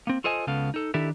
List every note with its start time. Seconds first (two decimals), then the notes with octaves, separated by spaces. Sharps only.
0.07 A#3 C4
0.24 F4 A4 C5 D#5 G#5
0.47 C#2 C#3 B3 A4 F5
0.74 D#4 A4
0.94 D#3 D4 E4 G4 A4